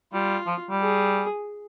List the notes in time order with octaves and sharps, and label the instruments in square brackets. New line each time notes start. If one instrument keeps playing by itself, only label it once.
[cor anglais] G3 [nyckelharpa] F4
[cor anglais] F3
G3
[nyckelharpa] G#4